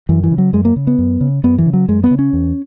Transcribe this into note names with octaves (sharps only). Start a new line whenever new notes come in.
F#2 E3
E3
C#3
F#3
F#2 G#3
A#3
C#3
B3
F#2
C#3
F#2 B3
E3
C#3
F#3
F#2 G#3
B3
C#3
C#4
E2